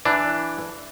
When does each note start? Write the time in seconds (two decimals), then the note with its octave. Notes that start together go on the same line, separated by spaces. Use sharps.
0.05 E3 D4